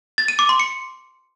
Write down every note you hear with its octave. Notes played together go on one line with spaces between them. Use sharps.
A6
D#7
D6
C6
C#7